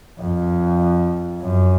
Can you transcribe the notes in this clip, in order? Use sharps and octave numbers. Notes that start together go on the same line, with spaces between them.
F2
F#2